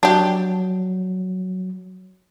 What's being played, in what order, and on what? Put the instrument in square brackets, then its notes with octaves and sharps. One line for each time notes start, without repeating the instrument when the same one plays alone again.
[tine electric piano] F#3 [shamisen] D4 G4